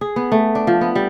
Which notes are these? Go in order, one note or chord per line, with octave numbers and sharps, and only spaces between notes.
G#4
B3
A3
D4
F3
B3
G3